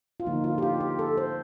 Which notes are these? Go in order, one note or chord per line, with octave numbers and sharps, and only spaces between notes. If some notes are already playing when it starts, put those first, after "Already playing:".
F4
D3 F3 A#3 D#4
F4
G4
F4
G4
A4
C5